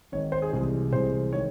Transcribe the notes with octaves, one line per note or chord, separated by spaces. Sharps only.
G#1 G#2 D#3 C#5
C5
G#4
C2 C3 E3 G#3
C2 C3 E3 G#3 C5
D#3 G#3 C#5